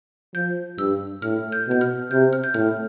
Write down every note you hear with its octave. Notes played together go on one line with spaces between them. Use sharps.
F3 G6
G2 E6
A2 F6
G6
B2 G6
F6
C3 G6
F6
G6
A2 F6